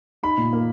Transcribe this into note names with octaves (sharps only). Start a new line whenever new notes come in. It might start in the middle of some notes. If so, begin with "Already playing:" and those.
D#4 B5
A#2
A#3